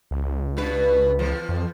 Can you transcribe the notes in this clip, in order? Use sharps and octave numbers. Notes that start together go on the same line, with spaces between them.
C#2
G2 B2 B4
E2 F3
F2